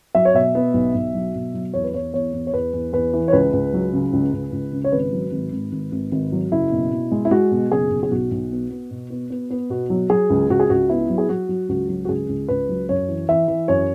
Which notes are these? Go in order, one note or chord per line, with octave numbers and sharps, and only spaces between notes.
F#3 E5
C#5
B2 E5
B3
B1
B1
F#3
B2
F#3
E2 C#5
B4
E2 C#5
E2 C#5
E2
C#5
E2 B4
E2
E2 B4
E3
C#5
C#2 B4
C#2
F#3
C#3
C#2
C#2
C#2
C#3
C#5
G#1 B4
F#3
G#1
G#1
G#1
G#1
G#1
F#3
F#1 E4
B2
B2
G#3
E4
G#3 F#4
B2
F#1 G#4
B2
G#4
B1 F#4
B1
B3
B3
B2
B3
B3
B3
B2 F#4
F#3
F#3 G#4
C#2
C#2 F#4
G#4
C#2 F#4
B3 E4
F#3
G#4
F#3 F#4
F#3
C#2 F#4
F#3
F#4
C#2 G#4
C#2
C#2 B4
F#3
F#2 C#5
E3
E3 E5
E3
F#2 C#5